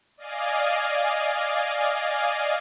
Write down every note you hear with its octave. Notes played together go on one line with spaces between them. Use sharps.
D5 D#5 F5 G#5